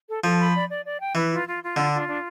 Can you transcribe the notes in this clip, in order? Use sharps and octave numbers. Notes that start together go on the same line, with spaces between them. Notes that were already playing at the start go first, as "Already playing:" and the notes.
A4
F3 A4
B5
D5
D5
D5
G5
E3 B4
F4
F4
F4
D3 D4
F4
D4